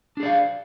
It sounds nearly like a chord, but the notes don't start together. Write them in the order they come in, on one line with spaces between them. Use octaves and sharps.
D4 G#4 D5 F5